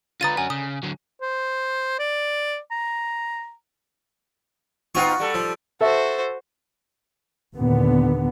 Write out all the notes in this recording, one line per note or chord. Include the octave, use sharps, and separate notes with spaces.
D3 F4 B4 A#5 D#6 A6 D#7
C#4 F#4 G#5
C#3 D#6
D3 F#3
C5
D5
A#5
B3 D#4 F4 F#4 C#6
G3 A4
F3
F#4 A4 C5 E5
D#2 A#2 D3 B3